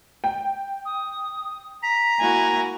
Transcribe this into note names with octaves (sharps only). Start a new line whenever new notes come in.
G5
D#6
A#5 B6
A#3 E4 F#4 G#5